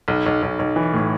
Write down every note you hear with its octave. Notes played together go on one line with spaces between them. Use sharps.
B1
B1
B1
B1
E3
A2